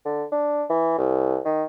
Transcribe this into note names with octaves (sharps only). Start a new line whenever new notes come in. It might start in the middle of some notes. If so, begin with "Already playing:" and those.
D3
D4
E3
C2
D#3